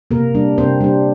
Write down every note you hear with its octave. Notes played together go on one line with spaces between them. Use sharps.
C3 A#3 A#4
G3 D4
C3 C4 C5
G3 D4